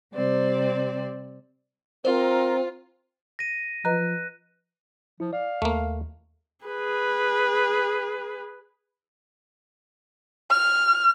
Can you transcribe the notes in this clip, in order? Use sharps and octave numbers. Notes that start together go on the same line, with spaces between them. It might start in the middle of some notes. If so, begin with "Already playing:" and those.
C3 G3 C4 C5 D5
C4 F4 A#4 C5
A#6 D#7
F3 B4 D#5 A#5 F#6
F3 E4
D5 F5
D#2 A3 A#3
G#4 B4
F6